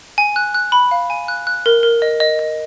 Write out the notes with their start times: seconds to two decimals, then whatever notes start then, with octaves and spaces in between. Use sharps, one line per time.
0.18 G#5
0.36 F#6
0.55 F#6
0.72 B5
0.91 F5
1.10 G#5
1.28 F#6
1.47 F#6
1.66 A#4
1.83 A#4
2.02 D#5
2.20 D#5
2.39 D#5